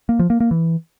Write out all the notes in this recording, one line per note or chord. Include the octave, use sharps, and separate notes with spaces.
A#3
F3
A#3
A#3
E3